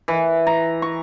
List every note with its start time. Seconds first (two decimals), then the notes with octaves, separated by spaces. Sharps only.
0.08 E3
0.47 A#5
0.82 C#6